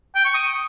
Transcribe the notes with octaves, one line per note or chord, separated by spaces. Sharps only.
G5
C#6
D#6